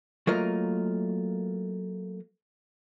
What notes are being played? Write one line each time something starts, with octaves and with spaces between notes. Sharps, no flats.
F#3 A3 A#3 F4 A#4 D#5